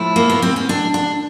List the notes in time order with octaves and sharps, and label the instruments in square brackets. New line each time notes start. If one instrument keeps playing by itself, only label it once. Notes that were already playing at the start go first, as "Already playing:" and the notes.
Already playing: [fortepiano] A2 F3 A3 [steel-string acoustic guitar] E4
[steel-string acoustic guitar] A#3
B3
C4
C#4
D4
D4